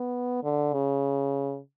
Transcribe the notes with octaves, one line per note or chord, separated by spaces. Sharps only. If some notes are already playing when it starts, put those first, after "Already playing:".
Already playing: B3
D3
C#3